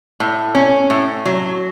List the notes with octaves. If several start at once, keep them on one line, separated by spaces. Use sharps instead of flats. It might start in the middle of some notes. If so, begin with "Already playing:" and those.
A2
C#4
A2
F#3